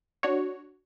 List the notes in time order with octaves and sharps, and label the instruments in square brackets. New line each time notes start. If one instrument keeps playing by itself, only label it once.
[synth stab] D4 F#4 C#5